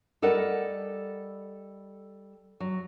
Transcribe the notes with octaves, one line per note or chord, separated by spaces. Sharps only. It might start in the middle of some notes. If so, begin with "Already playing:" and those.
G3 A4 A#4 D#5 F#5
F#3